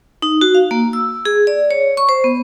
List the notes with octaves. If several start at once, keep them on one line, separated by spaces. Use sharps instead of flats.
D#4
F#4
F5
A#3
E6
G#4
D5
C#5
C#6
C5
B3